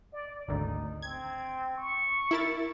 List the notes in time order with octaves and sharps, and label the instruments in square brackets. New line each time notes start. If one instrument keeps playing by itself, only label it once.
[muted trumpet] D5
[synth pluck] G#1 D2 [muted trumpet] D#4
[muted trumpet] C4 [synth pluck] G#6
[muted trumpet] C#6
[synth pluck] E4 A#4 A6